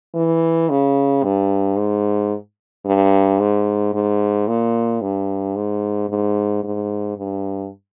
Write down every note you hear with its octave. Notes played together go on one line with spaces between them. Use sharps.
E3
C#3
G2
G#2
G2
G#2
G#2
A#2
G2
G#2
G#2
G#2
G2